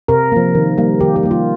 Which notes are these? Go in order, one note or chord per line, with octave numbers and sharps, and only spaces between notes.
C3 A#4
F3 A#3
D#3
G3 A#3
D#3 G4
G4
G3 A#3
F4